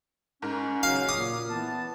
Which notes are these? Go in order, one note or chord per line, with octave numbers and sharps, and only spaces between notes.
G#2 C#4 A#4
C#3 F#3 F#4 F5
A#2 D6 D#6
E3 B3 A5